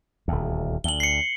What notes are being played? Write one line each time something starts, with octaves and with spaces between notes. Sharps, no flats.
D#1 D2
D2 F#7 G7
C7 C#7